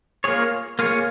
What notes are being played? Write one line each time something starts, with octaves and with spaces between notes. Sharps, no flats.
A#3 F4 G#4 C#5
A#3 F4 G#4 C#5